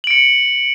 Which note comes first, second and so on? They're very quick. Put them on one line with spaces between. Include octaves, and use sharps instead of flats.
F#7 D7 C#7